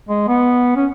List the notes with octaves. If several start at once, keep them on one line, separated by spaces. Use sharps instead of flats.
G#3
B3
C#4